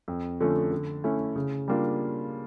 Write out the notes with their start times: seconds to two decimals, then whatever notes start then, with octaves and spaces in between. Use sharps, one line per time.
0.08 F2
0.41 D3 F3 A3 C#4
0.72 D3
1.04 A3 C#4 E4
1.36 C#3
1.68 G3 A#3 D4 F4